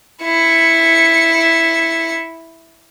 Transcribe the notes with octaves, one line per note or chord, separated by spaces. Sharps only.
E4 C#7